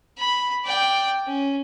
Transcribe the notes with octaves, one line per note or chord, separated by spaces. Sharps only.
B5
D5 G5
C#4